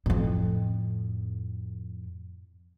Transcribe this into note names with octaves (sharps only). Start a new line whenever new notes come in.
F2 A2